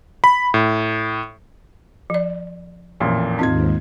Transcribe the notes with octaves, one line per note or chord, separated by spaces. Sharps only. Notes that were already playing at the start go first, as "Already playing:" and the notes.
B5
A2
F3 D5
A1 F2 A#2
D#2 G#2 C4 D#4 F4 G#6